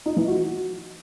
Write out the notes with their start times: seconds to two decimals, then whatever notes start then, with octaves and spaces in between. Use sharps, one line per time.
0.06 D#4
0.17 E3
0.27 F#4